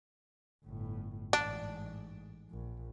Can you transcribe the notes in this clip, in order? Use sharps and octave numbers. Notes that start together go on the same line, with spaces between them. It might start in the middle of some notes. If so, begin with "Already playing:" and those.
G1 A2
A1 G#2 D4
A#1